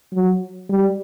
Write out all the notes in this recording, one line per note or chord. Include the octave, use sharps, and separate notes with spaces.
F#3
G3